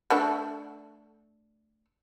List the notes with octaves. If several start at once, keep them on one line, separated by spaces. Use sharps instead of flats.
A3 D4 A4